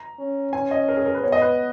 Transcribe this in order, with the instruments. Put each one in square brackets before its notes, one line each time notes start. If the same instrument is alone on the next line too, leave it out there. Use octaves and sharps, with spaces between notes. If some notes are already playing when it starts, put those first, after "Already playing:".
Already playing: [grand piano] A#5
[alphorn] C#4
[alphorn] C#4 [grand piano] G#5
[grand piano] D#5
A#4
G#4
A#4
B4
[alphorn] B3 [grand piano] C#5
[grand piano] D#5
B4